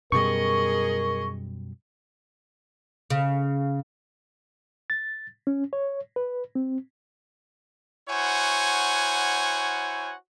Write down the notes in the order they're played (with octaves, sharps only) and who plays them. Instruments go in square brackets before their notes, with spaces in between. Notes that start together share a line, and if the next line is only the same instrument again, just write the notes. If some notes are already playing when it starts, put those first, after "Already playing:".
[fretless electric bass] F#2 B2 G3 [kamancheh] G#4 D#5 [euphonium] A#4 [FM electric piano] C#6
[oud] C#3
[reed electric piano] A6
C#4
C#5
B4
C4
[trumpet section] E4 F#4 C5 C#5 F#5 G#5